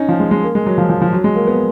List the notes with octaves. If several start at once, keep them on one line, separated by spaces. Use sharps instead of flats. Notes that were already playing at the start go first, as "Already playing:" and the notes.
Already playing: C#4 D#4
F3
G#3
G#3
A#3
G#3
F#3
F3
F3
F3
F#3
G#3
A#3
B3